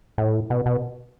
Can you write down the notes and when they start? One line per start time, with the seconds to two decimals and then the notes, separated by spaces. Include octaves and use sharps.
0.18 A2
0.50 B2
0.66 B2